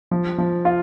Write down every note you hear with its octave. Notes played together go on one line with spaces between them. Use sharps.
F3
F3
F4